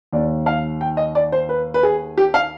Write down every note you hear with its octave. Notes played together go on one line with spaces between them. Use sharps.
D#2 D#3 D5
F5
G5
D#5
D5
C5
B4
B4
G#4
G4
F5